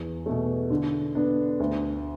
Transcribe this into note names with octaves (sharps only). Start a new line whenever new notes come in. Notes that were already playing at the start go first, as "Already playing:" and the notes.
Already playing: E2
B2 A3
D3
B3 D4
D2